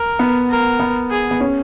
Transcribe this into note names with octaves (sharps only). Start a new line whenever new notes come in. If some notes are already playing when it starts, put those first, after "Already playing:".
Already playing: A#4
B3
A#4
B3
G#4
B3
C#4